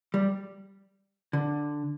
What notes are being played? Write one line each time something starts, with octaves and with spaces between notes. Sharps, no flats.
G3
D3